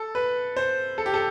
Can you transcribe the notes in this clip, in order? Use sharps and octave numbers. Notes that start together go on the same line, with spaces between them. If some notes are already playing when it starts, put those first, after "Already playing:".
Already playing: A4
B4
C5
A4
G4
A4